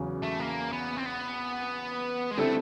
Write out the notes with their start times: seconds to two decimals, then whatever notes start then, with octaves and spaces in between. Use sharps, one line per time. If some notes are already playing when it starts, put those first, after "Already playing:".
Already playing: E2 C#3 F#3
0.22 A3
0.40 A#3
0.72 B3
0.97 C4
1.06 B3
2.31 G#3
2.37 D3 G3 A3 C4 E4 A4